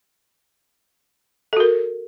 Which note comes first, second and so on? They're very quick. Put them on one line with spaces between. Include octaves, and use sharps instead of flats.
A4 F#4 A#4